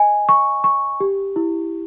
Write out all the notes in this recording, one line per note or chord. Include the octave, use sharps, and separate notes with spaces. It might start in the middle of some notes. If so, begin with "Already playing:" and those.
Already playing: D#5 G#5
C#6
C#6
G4
E4